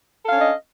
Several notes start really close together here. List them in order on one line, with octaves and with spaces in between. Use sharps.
A4 F5 C#4 D4 D#5